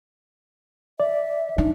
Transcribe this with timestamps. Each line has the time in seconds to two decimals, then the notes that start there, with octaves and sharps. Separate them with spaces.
1.00 D5 E5
1.58 D4 D#4